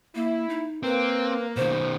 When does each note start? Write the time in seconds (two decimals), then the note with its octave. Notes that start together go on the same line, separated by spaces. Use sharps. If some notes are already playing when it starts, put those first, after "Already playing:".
0.15 A#3 E4
0.49 D#4
0.83 A#3 C4 B4
1.57 B2 D#3 C5